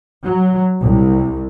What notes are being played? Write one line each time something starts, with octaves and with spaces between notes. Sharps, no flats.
F#3
C2